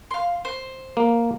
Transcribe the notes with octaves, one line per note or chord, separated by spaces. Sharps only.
F5 C6
C5
A#3